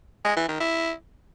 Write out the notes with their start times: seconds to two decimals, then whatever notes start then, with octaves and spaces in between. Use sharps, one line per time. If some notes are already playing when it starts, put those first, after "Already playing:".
0.25 G#3
0.37 E3
0.49 D#3
0.60 E4